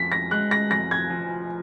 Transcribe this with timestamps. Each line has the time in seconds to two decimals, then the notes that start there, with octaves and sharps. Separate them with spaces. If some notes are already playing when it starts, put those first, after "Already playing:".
Already playing: F2 B6
0.12 A#6
0.31 G#3 F#6
0.51 A#6
0.71 F2 A#6
0.91 G#6
1.10 F3